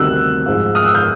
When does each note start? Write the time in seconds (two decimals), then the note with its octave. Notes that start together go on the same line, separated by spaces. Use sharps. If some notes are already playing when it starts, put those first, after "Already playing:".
Already playing: D2 C3 D#3 G3 E6 F#6
0.46 G#2 F3 G#3
0.75 D#6 F6
0.85 E6 F#6
0.95 F6 G6